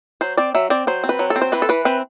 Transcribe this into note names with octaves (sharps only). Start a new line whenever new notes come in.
F#3 C5
C4 D5
F#3 E5
C4 D5
F#3 C5
C4
B4
F#3
A4
C4
C5
E3 B4
A4
E3 B4
C4 B4